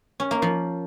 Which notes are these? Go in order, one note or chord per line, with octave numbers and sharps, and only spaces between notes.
C#4
A#3
F3